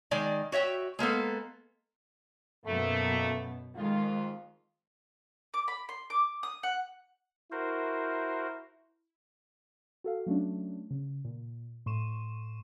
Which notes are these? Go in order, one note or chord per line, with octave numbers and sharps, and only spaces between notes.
D#3 G#3 D5 D#5
F#4 C#5 E5 G5
G#3 A#3 B3 A4
F#2 B2 A3 A#3
F2 D#3 G#3 F4
D6
B5
C6
D6
D#6
F#5
E4 F#4 A#4 C5
F#4 A4 F5
F#3 A3 C#4 D4
C#3
A#2
A2 C6 C#6 D#7 E7